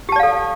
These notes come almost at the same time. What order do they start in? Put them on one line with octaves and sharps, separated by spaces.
G4 A5 D5 F5 A4